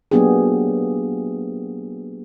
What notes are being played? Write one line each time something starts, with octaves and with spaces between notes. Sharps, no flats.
F#3 A#3 B3 D4 G4 G#4